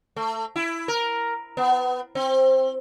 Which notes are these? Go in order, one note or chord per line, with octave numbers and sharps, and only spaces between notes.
A3
E4
A#4
B3
C4